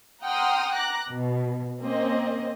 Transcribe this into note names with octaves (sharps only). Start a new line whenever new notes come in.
F#5 G5 A#5 C6 D#6 F6
A#5 D6 F#6 A#6
B2
A#3 C4 C#4 D#5